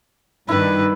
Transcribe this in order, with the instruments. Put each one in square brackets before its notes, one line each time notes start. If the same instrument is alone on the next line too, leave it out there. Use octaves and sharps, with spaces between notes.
[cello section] G2 D#3 D4 [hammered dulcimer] E4 [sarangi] B4